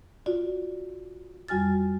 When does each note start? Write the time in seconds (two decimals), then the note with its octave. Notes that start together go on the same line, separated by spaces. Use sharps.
0.26 F4 F#4 D5
1.48 F2 G3 F#4 G#5 F6 A6